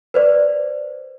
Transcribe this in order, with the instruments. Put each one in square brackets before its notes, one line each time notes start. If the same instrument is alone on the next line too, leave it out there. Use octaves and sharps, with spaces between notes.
[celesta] B4 C5 D5